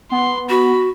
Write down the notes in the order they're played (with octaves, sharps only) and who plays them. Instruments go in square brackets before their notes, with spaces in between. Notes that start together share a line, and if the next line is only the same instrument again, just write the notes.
[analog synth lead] B3 [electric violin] C6
[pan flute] F#4 [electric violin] B5